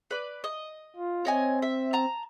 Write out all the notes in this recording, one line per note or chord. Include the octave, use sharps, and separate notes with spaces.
B4 D5
D#5
F4
C4 C#5 D#5 G#5
E5
A5 A#5